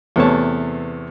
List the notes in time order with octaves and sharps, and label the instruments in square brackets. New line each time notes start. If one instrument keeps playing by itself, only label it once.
[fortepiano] E2 C3 A3 B3 C#5 A5